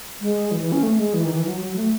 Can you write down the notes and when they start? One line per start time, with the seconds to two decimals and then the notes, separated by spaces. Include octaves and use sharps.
0.21 G#3
0.51 E3
0.62 E3
0.72 C#4
0.83 A3
0.99 G#3
1.14 E3
1.25 D#3
1.35 E3
1.45 F#3
1.61 F#3
1.76 A3